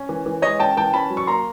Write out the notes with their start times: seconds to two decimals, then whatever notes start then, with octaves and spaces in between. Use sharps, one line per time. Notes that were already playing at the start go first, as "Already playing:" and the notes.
Already playing: C#4
0.09 E3
0.26 E3
0.42 G#3 C#5 D#5
0.60 C#4 G5 A5
0.77 E3 G5 A5
0.93 C#4 A5 B5
1.10 F#3
1.17 C#6
1.27 A#3 A#5 C6